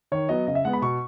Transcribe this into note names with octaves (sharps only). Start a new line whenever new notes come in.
D#3 C#5
F#3 B3 D#5
C#3 D#5
E5
G#3 B3 F#5
B5
B2 C#6